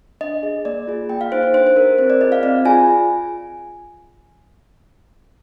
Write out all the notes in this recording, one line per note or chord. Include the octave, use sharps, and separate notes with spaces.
D4 D#5
G#4
A#3 D5
F4 G#4
A#3 G5
F5
D#4 G#4 C5
C5
D4 C5
C5
G4 A#4
C4 C5
D5
F4 G#4 D#5
F5
C4 D5
F4 G#4 G#5